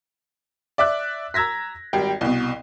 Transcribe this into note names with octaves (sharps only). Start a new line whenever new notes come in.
D5 E5 D6 F#6
A#5 E6 G#6 A#6 B6
G#1 G3 G5
C2 B2